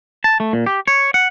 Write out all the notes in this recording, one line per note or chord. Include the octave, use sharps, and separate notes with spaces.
A5
A3
A#2
G4
C#5
F#5